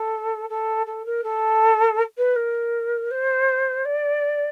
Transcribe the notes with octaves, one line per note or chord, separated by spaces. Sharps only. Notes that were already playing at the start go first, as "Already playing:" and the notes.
Already playing: A4
A4
A4
A#4
A4
B4
A#4
C5
D5